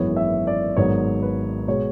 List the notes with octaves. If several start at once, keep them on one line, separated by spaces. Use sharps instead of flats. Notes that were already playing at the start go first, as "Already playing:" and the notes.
Already playing: G#1 F#2 E3 G#3 B3 C#5
E5
D5
G#1 G#2 F#3 B3 C#5
B4
B2 G#3 C#5